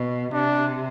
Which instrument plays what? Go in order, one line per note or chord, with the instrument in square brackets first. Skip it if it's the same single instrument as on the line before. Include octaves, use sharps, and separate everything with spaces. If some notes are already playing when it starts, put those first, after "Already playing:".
Already playing: [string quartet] B2
[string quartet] C3 [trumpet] D4